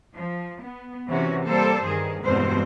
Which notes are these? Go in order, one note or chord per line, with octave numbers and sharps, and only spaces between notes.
F3
B3
C3 E3 C#4 F#4
G3 A#3 A4 C5
G2 D#3 G#4
E2 G2 B2 G#3 C4 C5